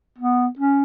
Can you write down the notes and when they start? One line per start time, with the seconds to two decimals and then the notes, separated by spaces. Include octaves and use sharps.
0.18 B3
0.59 C#4